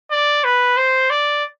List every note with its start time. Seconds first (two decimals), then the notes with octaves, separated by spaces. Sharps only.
0.11 D5
0.44 B4
0.77 C5
1.10 D5